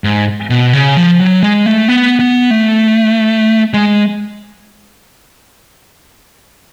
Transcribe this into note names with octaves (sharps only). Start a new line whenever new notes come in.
G#2
B2
C#3
F3
F#3
G#3
A3
B3
B3
A3
G#3